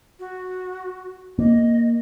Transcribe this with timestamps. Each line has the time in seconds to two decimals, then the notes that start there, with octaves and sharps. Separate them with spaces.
0.20 F#4
1.39 A#3 D#5